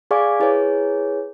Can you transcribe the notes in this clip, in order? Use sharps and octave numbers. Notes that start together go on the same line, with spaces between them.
G#4 D5 F5 G#5 C#6 D6
E4 G#4 B4 C#5